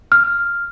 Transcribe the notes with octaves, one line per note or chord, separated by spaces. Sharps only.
F6